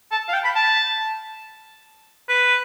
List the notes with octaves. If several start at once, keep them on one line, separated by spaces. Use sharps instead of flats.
A5
F5
G5
B5
A5
B4